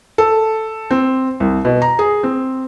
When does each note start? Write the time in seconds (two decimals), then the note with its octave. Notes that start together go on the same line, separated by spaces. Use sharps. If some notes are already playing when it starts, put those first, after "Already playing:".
0.18 A4
0.91 C4
1.40 C2
1.65 B2
1.82 A#5
1.99 G#4
2.23 C4